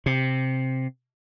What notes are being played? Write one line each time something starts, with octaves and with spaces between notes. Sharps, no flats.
C3